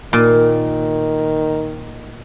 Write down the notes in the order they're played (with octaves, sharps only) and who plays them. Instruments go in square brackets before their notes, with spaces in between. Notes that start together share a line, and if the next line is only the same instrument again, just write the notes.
[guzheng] A#2 [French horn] D#3